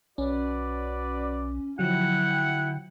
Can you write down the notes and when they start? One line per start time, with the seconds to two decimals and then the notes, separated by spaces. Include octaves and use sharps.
0.18 B1 C#4 F#4 B4 D5
1.79 D3 F3 F#3 E4 F#5 G5